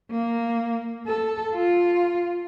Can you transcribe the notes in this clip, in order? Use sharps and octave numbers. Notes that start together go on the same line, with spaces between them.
A#3
A4
F4